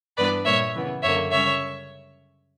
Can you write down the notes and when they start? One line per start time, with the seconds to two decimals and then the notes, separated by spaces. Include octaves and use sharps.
0.17 G2 E3 G3 B3 D4 B4 D5
0.45 A#2 G3 A#3 C#5 E5
0.74 C#3 E3 B3
1.03 F#2 D3 A#3 C#5 E5
1.31 C#3 G3 C#4 C#5 E5